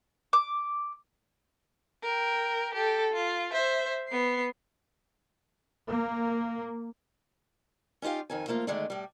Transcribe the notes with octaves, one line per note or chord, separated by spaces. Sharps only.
D6
A#4 G5
G4 A4
F4
C5 E5
B3 C7
A#3
C#4 D#4 F4 G4 F5
F2 D#3 G#5
F3 A3 A#3 F4
D3 D#3 G#3 A3 D4
A2 G3